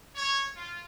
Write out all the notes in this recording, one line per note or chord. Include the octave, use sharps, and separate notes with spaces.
C#5
F4